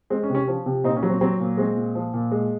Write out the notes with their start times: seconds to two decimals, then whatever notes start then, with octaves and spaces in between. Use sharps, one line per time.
0.10 G#3 C4
0.23 C#4
0.30 C3
0.35 C#4
0.47 F3 C#4
0.66 C3
0.84 A#2 C4 D#4
0.97 C#4
1.03 F#3
1.09 C4
1.21 F#3 C4
1.40 A#2
1.57 G#3 C4
1.77 A#2
1.95 F3
2.14 A#2
2.32 G#3